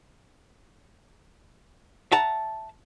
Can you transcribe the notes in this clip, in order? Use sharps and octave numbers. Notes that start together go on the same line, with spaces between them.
E5 F#5 A5 A#5